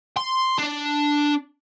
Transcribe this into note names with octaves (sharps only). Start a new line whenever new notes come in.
C6
D4